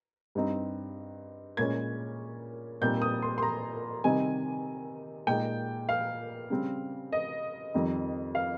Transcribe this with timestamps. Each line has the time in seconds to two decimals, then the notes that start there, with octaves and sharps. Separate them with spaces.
0.35 G2 G3 C4 D#4
1.57 A#2 G#3 C#4 G#6
2.81 A#2 G3 C4 D#4 G6
3.02 D#6
3.22 C6
3.38 C6
3.43 A#5
4.04 C3 D#3 G3 C4 D#4 G#5
5.27 A#2 G#3 D#4 G5
5.89 F5
6.50 C#3 G3 C4
7.13 D#5
7.74 F2 D#3 G3 C4 D#4
8.35 F5